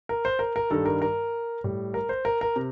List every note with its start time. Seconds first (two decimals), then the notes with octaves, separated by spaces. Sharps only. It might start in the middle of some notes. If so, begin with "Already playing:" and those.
0.09 A#4
0.25 C5
0.39 A#4
0.56 A#4
0.70 G2 D#3 G3 A4
0.86 A#4
1.02 A#4
1.64 A2 G3
1.94 A#4
2.09 C5
2.25 A#4
2.41 A#4
2.56 C3